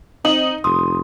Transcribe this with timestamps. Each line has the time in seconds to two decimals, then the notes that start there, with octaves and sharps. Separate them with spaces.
0.25 C4 D#4 F#7
0.64 F1 C6 D#6